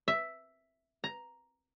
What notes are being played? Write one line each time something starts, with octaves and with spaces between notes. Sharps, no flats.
E5
A#5